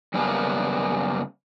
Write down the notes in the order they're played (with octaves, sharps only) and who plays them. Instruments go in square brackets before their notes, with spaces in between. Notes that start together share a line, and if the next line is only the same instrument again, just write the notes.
[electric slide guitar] F#2 C#3 G3 A#3 B3